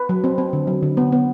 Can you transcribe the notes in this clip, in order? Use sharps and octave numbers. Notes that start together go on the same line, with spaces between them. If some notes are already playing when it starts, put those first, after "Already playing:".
Already playing: B4
F#3
C4
C4
D3
F#3
D3
B3
B3